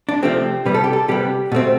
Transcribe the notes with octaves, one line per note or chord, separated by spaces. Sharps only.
D4
C3 F3 A3 C4 G4
C3 G3 B3 B4
A4
G4
A4
C3 G3 B3 G4
B2 A3 C4